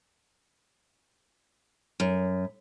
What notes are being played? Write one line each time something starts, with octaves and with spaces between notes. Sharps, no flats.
F#2